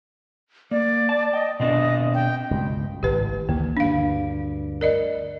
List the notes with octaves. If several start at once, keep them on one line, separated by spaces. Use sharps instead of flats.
A#3 D5
A5
D#5 G5
B2 C4 D4 D#5
G5
C#2 G2 B2
G#1 A2 G4 B4
D2 D#3 E3 A#3
D2 G2 D4 F5
A#4 D5 D#5